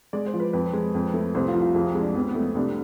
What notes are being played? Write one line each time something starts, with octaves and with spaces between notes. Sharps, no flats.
G#3 D5
C5
F3
B4
F2 B4
G#3
F2
A3
C2 C5
F4
F3
F4
F2 G#4
G#3
D4
F2 B3
B3
A3
B3
C2 D4